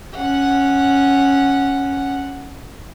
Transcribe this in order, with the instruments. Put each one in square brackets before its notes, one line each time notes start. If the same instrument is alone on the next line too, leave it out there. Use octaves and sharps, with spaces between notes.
[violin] C#4 F#5